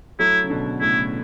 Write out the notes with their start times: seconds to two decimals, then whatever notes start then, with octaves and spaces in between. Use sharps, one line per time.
0.19 F#3 A3 E4
0.43 C#3
0.50 B2 D3
0.81 A2 C#3 E4